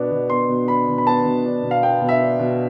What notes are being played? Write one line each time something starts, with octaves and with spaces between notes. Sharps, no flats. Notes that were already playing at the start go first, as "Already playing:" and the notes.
Already playing: B2 B3 D4
B2
B3 C6
B2
D4 B5
B2
B5
B3 A5
B2
D4
B2
F5
B3 G5
B2
E5
D4
B2